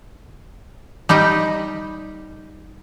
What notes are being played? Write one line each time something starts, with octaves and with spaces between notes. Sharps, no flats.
G3 D#4 G4 D#5